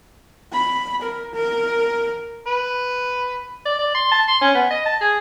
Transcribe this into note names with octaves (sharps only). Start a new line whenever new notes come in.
B5
A#4
A#4
B4
D5
D5
C6
A5
C6
C#4
B3
D#5
A5
G#4